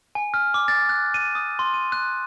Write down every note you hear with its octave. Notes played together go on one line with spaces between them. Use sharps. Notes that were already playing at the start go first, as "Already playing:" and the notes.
G#5
F6
D6
A6
F#6
D#7
D#6
C6
D#7
F#6